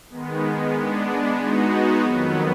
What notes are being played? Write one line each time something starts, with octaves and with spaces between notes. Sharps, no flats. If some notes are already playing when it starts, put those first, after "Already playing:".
D#3 G#3 B3
G#3 B3 D4
G#3 B3 D#4 F#4
F2 D#3 F#3 B3